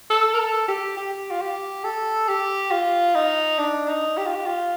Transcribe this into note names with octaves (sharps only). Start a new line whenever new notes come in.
A4
A#4
A4
G4
G4
F4
G4
A4
G4
F4
D#4
D4
D#4
G4
F4
G4
F4